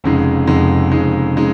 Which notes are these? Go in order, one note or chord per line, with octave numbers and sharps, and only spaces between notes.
F1 F2 C#3 G#3 D#4
F1 F2 C#3 G#3 D#4
F1 F2 C#3 G#3 D#4
C#3 G#3 D#4